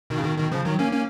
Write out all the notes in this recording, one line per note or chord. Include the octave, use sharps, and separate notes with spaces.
B2 D#3
C#3
B2 D#3
B2 D#3
C#3 F3
D#3 F#3
A#3 C#4
A#3 C#4